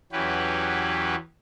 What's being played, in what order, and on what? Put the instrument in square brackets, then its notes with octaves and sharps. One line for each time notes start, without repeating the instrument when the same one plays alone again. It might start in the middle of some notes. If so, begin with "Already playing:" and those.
[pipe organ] E2 E3 F#3 C#4 G4 B4